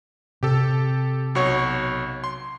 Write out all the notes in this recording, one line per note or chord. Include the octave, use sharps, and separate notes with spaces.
C3 G4 A4
B1 F#4 C#5
C6